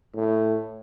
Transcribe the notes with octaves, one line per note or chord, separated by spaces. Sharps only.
A2